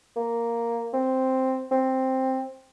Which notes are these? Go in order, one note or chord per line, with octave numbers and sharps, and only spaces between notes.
A#3
C4
C4